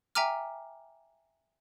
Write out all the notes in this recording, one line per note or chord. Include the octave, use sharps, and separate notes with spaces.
E5 G5 G#5 A#5 D6 F6